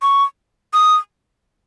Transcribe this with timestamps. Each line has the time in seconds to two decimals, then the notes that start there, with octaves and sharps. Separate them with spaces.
0.02 C#6
0.74 D#6